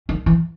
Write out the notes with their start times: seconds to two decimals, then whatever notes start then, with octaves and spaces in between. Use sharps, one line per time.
0.09 D#3
0.26 E3